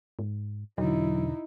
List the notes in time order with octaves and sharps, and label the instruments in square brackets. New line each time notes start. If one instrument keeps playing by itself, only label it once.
[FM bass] G#2
[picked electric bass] E1 D3 [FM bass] F#3 [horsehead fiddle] D#4 E4